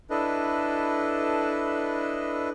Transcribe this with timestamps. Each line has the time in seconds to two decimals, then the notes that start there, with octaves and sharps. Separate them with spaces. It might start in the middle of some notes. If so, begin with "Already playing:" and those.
0.10 D4 E4 A4 B4 D#5